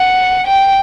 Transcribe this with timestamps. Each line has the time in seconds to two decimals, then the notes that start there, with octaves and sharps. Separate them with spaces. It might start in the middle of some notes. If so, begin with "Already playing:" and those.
Already playing: F#5
0.47 G5